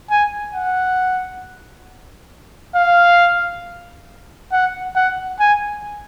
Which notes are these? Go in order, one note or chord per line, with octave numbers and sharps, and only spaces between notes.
G#5
F#5
F5
F#5
F#5
G#5